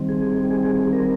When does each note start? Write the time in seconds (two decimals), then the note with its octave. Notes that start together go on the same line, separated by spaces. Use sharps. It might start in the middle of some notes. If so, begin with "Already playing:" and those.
Already playing: D#3 G3 C4
0.09 G#4
0.51 G#4
0.85 G#4
0.93 A#4